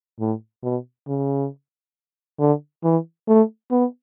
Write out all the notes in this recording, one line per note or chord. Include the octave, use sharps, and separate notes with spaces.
A2
B2
C#3
D3
E3
A3
B3